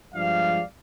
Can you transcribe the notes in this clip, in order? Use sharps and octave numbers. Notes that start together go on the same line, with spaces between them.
G2 F3 G#3 D5 F5